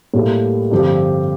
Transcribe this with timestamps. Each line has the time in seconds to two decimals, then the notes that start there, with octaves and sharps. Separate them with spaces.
0.14 A2 G3 A#3 F4 A4
0.71 G2 D3 F3 C4 G4